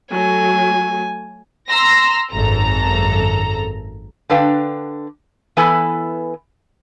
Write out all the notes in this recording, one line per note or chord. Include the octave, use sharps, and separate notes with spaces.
F#3 A3 G#5
A#5 C6 E6 A#6
G#1 F#2 A4 A#5
D3 D4 B4 F5 G5
E3 B3 E4 A4 B4 G#5